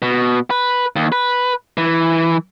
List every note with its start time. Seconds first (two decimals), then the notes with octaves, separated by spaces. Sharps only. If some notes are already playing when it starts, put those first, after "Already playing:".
0.02 B2
0.50 B4
0.96 D#2
1.12 B4
1.78 E3